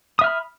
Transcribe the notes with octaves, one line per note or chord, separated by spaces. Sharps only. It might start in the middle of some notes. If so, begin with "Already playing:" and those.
E5 B5 D#6 F6